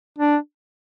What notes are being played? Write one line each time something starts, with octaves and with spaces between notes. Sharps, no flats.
D4